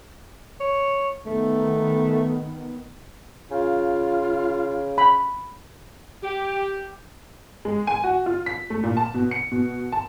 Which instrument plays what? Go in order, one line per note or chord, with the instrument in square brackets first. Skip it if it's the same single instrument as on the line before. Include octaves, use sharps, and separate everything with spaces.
[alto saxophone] C#5
[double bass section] D#3 B3 [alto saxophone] A3
[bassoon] C#3 [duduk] F4
[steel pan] B5
[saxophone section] G4
[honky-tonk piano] G#3
G#5
F#4
F4
B6
A3
A#2
A5
B2
C#7
B2
A5